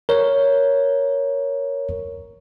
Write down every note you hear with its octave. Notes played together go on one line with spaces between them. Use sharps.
A#4 C#5